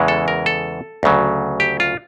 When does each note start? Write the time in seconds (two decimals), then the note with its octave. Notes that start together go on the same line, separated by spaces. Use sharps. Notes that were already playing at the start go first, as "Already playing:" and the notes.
Already playing: E2 C#3 E3 G#3
0.08 A4
0.28 A#4
0.46 A4
1.03 D2 C#3 F#3
1.60 G4
1.80 F4